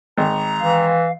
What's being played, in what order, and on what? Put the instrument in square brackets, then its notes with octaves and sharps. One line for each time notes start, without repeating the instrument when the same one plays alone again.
[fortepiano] G#1 [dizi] A#5
[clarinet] E3 [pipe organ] F5